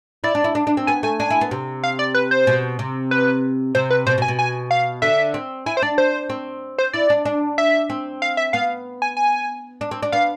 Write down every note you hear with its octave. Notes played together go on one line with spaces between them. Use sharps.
E4 D5
D4
E4
D4
D4
C4
B3 G#5
A3 G#5
D4 G#5
E4
B3
C3
F5
D5
B4
C5
B2
C3
B4
C3 C5
B4
B2 C5
B2
G#5
B2
G#5
F5
D3 E5
C4
E4 G#5
C5
D4 D5
C5
C4
C5
E4 D5
D4
D4
E5
C4
F5
E5
B3 F5
G#5
G#5
D4
C4
D4
B3 F5